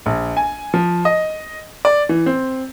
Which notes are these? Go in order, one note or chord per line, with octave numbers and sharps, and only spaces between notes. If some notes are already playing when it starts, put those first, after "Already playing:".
A#1
G#5
F3
D#5
D5
E3
C4